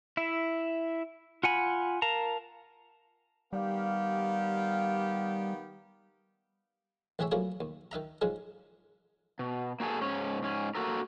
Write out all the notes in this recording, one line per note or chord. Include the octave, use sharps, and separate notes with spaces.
E4 E5
F4 F#5 G#5 B5
A#4 F5 A5 A#5
D#3 G3 B3 G4 F5
A1 E3 C4 G#4 C#5 E5
F3 F#3 A3 A#3 E4 G#4
D#2
D#3 D#4 E5 A#5
G#2 C#3 F3 G#3 G#4
B2
A#3 F#4 G#4 A4
G#2 C#4 C#5
G#2 C#4
A#3 F#4 A4 A#4